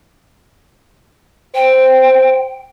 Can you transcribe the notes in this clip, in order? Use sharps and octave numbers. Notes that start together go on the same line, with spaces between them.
C5 G5